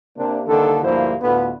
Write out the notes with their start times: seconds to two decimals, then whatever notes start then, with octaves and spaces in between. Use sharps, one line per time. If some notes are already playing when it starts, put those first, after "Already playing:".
0.17 C3 A#3 D4
0.47 C2 D3 D#3 A#3 A4
0.83 D2 G2 F3 A#3 E4 C5
1.22 D2 A2 B3 F4 B4